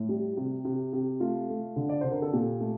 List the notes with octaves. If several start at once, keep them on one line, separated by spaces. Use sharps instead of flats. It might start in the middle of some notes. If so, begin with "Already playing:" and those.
Already playing: A2
G3
C3
C3
C3
A3 F4
A3
D3
D5
D3 C5
A#4
A4
A#2 G4
A3